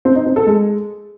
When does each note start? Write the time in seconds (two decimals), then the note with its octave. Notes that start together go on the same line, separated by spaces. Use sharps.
0.05 C4
0.16 D#4
0.26 C4
0.36 A4
0.46 G#3